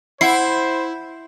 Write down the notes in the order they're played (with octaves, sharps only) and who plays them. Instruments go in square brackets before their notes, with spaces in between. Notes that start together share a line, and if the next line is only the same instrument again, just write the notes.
[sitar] E4 [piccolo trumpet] C5 [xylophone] F#5 C7